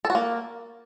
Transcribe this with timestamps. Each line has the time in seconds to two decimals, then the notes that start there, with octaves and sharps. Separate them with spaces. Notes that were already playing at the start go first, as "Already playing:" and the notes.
0.05 A4
0.10 F#4
0.15 A#3